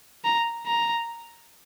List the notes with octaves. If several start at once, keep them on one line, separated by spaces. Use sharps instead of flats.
A#5
A#5